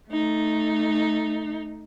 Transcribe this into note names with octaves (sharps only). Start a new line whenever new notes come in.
A3 D#4